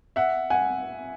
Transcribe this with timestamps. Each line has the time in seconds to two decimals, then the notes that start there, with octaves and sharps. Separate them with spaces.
0.16 E5 F#5
0.50 F#5 G#5